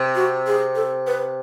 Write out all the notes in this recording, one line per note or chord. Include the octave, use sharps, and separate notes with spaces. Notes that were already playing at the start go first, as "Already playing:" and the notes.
Already playing: C3
F#4
G#4
A4
B4